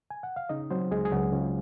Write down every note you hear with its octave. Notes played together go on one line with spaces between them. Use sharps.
G#5
F#5
F5
C#3 D#4 D#5
F#3 C4 C5
C#2 G#3 G#4
G#4
C#2 F#3 F#4
C#3 F4